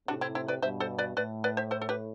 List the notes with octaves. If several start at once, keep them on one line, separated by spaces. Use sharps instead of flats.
A2 C3 D4 F#4
C4 E4
C4 E4
B4 D5
G2 B2 C5 E5
A4 C5
B4 D5
A2 B4 D5
B4 D5
C5 E5
A4 C5
A4
G4 B4